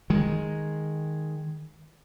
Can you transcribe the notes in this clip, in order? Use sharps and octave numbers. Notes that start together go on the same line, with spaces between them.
D#3 G#3